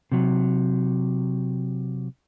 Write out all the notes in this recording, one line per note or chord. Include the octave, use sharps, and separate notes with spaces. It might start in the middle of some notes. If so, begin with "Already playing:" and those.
C3 F#3